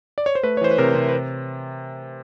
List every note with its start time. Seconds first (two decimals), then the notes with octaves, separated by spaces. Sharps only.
0.18 D5
0.26 C#5
0.35 C5
0.44 A3 B4
0.57 C#5
0.61 E3 C5
0.71 B4
0.78 C3 A#4
0.95 C3
1.09 B4